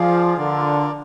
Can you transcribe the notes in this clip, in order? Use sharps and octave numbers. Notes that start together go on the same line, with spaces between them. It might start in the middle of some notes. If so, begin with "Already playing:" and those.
Already playing: F3 F4 G#4 D5 F5
D3 F4 A#4 D5